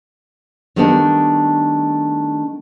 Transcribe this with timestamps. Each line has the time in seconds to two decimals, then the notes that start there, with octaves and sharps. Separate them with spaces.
0.76 D#3 G3 A3 B3 C4 D4